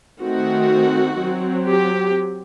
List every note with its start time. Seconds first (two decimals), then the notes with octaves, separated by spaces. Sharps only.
0.21 D#3 A3 C4 F#4
1.19 F#3 C4
1.67 G4